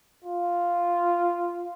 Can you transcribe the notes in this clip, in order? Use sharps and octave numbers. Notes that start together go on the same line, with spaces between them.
F4